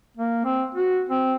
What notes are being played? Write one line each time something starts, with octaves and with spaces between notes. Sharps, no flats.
A#3
C4
F#4
C4